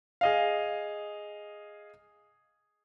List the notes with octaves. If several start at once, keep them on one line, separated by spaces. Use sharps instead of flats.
G#4 D#5 F5